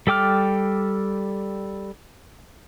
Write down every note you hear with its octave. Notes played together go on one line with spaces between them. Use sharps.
G3 A4 G5 D6 F6